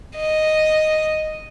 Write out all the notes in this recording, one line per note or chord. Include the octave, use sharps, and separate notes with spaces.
D#5